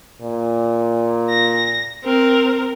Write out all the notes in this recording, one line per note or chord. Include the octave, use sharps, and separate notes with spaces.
A#2
A#6
C4 A#4